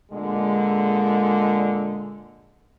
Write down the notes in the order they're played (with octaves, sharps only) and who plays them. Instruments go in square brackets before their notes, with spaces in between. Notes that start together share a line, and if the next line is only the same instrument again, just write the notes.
[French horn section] A#2 D3 G#3